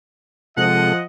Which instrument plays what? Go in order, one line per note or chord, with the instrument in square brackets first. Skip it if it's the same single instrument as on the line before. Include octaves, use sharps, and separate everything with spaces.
[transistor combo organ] C3 G#3 A4 [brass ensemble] F3 D#5 [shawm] F#5